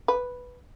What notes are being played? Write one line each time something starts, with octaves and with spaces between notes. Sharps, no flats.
B4